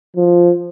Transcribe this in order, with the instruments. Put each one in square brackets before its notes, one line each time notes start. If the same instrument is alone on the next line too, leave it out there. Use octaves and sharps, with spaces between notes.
[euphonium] F3